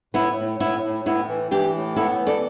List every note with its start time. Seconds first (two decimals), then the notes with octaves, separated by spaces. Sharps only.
0.14 A2 B3 E4
0.37 A2
0.60 A2 B3 E4
0.83 A2
1.05 A2 B3 E4
1.28 E3
1.51 E3 D4 G4
1.74 A2
1.96 B3 E4 A4
2.19 E3
2.27 A4 D5